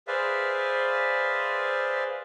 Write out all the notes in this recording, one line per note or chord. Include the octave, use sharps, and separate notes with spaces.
G#4 B4 C5 D5 E5 F5